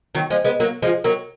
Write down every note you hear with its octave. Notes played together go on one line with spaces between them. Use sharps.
D#3 F#3
F3 G#3
G#3 B3
F#3 A#3
F3 G#3
F#3 A#3